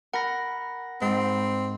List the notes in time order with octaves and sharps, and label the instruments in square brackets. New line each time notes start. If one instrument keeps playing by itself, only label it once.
[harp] A#4 [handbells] F#5 B5 A#6
[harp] G#2 [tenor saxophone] C4